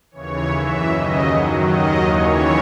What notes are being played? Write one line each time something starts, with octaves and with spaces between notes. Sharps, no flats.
D#2 C#3 E3 C#5
F#2 E3 E5
D#2 C#3 F#3 D#5
F#2 D#3 F#3
D#2 D#3 F#3 D#5
D#2 C#3 E3 C#5